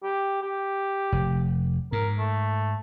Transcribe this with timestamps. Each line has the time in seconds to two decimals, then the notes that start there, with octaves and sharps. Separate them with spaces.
0.03 G4
0.42 G4
1.12 F1
1.92 G#2 A#4
2.18 A3